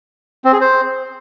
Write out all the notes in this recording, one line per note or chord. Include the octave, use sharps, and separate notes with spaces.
C4
G#4
C5